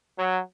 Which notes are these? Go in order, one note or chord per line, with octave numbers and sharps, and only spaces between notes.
F#3